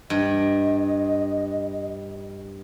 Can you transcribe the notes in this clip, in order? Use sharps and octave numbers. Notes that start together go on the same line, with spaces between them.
G2 D#5